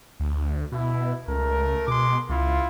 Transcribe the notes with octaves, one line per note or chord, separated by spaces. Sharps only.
D2
B2 E4
C#2 A3 A#4
B2 G#3 C6 D6
C#2 E4 F4